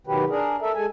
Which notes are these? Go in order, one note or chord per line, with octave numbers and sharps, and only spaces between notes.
B2 D#3 F#3 G4 B4
D4 G#4 A#4
A4 A#4 E5
G#3 A4 G#5